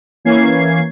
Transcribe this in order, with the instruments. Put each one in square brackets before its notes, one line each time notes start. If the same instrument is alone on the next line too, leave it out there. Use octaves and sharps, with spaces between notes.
[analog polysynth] E3 A#3 C#4 G#6 C7